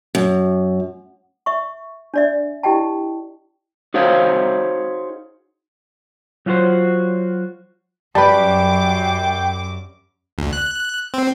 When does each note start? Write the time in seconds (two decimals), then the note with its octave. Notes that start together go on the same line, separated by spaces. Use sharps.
0.15 F#2
1.46 E5 C#6
2.14 D4 D5 E5
2.63 E4 G4 D#5 G5 A5
3.94 D#4 F#4 G#4 C5 C#5 F5
6.46 F#3 F4 F#4 G#4 C5 C#5
8.15 F#2 G3 B4 G5 A5 B5 D6
10.38 D2
10.53 F#6
11.14 C4